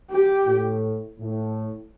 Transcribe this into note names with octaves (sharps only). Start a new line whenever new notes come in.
G4
A2
A2